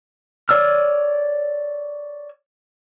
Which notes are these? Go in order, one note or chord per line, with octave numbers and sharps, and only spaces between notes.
C#5 D5 E6 F6